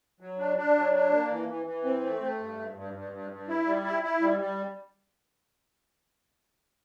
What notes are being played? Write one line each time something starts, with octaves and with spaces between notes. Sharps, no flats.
F#3
D4
D4
F#3
D4
A#3
E3
E3
E3
C4
A3
A3
G2
G2
G2
G2
G2
G2
E4
G3
E4
E4
G3
G3